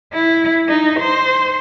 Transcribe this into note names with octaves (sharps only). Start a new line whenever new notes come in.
E4
D#4
C5